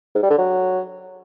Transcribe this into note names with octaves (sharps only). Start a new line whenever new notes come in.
G#2
G3
D3
F#3